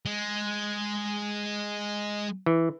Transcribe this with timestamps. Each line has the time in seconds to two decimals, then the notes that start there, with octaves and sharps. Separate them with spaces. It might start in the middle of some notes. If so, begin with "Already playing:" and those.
0.06 G#3
2.46 E3